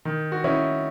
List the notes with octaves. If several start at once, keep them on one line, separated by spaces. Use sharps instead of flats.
D#3
F#4
D#3 C#4 E4